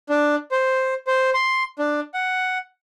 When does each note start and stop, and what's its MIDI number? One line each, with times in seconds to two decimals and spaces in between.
0.10 0.35 62
0.51 0.94 72
1.07 1.30 72
1.34 1.63 84
1.79 2.00 62
2.14 2.58 78